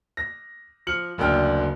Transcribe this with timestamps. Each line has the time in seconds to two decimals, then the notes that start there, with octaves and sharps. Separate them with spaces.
0.17 A#6
0.87 F3 F6 C#7 F#7
1.18 F#1 D2 D4 G5 F6